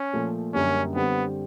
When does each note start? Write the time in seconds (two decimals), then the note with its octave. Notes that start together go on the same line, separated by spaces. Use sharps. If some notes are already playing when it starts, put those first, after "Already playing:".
Already playing: C#4
0.13 A#2 F3 A3
0.54 F#2 D3 G3 A#3 C#4
0.95 D3 G3 B3 C4